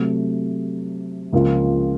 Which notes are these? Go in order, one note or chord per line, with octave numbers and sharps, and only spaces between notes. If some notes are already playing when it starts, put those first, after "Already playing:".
Already playing: C3 F#3 A3
C#2 C#3 F3 A#3 F4